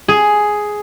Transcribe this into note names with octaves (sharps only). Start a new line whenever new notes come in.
G#4